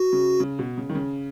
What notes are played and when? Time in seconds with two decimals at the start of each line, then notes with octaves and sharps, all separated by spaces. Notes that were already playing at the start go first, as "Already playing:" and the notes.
Already playing: F#4
0.13 C#3
0.40 C#3
0.59 B2
0.77 C#3
0.89 D#3
0.95 C#3